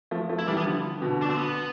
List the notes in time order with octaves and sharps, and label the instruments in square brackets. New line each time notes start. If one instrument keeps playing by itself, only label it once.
[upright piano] F3 A3
F3 A3
[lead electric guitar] E4
[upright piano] E3 G3 [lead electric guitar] D4
[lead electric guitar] B3
[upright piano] D3 F3
B2 D3
[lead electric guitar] D4
C4
B3